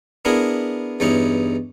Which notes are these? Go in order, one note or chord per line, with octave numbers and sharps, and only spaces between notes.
B3 D4 E4 G#4 A#4
E2 G2 C#4 D#4 E4